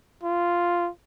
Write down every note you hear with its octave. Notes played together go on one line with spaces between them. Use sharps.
F4